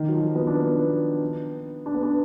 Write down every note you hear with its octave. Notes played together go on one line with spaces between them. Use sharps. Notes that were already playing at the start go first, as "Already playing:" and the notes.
Already playing: D#3
F#3
F3
B3
D4
B3
D4
B3
D4